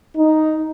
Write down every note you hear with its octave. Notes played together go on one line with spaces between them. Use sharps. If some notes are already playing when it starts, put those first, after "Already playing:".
D#4